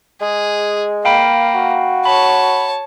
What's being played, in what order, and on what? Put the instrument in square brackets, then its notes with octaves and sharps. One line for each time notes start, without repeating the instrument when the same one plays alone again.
[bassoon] G#3 [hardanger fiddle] G#4
[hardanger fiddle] A#3 [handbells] F5 G5 B5
[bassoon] F#4
[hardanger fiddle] C#5 A5 [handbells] B5